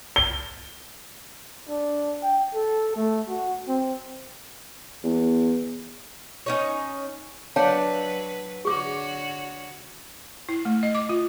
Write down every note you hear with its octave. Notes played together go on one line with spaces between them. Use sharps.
G7
D4
G5
A4
A3
F#4
C4
E2
C#4 D#4 C#5
F#3 D4 B4 C#5 F5 F#5 A5
D3 F#4 G#4 C#5 D6
E4
A3
D#5
D6
F4